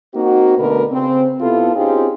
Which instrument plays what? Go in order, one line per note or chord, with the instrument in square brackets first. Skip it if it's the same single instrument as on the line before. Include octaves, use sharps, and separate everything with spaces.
[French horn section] A#3 C4 D#4 F#4
D2 B2 D3 A3 A#4 B4
C#3 C4
C3 B3 E4 F4 A4
C4 C#4 D#4 F4 G4 G#4